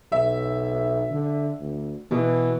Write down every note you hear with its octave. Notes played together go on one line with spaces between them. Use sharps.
B1 E5
D3
D2
B2 E3